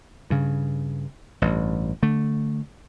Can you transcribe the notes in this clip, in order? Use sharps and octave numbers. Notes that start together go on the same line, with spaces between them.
G2 C#3
A1 G2
D3 A3